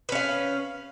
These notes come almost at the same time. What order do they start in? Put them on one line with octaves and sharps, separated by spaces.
B4 C#4 F5